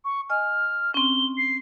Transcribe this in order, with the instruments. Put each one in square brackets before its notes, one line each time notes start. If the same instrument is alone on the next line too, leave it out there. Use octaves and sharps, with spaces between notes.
[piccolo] C#6
[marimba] D#5 G#5 [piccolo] F6
[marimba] C4 C#4 [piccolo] G7
[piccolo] C7